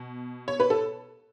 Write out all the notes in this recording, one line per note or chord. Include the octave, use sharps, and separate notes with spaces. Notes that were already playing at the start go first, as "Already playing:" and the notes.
Already playing: B2
C#5
B4
A4